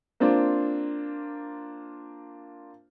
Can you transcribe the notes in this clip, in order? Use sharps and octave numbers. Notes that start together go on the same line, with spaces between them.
A#3 C4 D4 F4